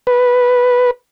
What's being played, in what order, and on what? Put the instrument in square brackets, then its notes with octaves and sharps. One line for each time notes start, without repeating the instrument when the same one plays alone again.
[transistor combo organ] B4